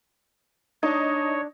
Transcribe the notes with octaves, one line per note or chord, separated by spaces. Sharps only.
D4 D#4 C#5